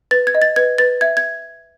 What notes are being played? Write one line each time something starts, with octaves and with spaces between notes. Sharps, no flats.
B4 A6
G#6
D#5
A6
B4 G#6
B4 A6
E5 G#6
G#6